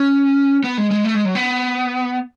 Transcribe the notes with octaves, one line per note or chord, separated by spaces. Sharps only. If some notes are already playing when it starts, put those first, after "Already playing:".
Already playing: C#4
B3
G#3
G#3
A3
G#3
F#3
B3